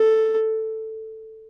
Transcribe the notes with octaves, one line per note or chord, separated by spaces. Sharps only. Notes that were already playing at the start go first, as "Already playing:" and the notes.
Already playing: A4